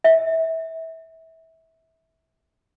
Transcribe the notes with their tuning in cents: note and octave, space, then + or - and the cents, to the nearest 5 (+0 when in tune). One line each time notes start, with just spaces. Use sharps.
E5 -25